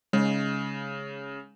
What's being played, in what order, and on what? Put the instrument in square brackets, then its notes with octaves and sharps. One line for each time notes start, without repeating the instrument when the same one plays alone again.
[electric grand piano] C#3 [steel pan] G#3